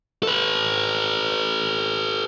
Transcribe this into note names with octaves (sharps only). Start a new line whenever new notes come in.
A4 B4